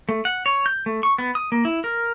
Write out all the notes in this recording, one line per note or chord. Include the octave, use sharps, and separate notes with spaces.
A3
F#5
C#5
G6
A3
C#6
B3
D#6
A#3
E4
A#4